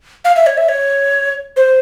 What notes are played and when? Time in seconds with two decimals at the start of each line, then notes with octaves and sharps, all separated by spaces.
0.25 F5
0.36 E5
0.47 C#5
0.57 E5
0.69 C#5
1.56 C5